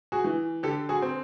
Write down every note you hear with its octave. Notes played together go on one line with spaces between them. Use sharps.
F#4 G#4
E3
D3 G4 A4
F#4 G#4
C4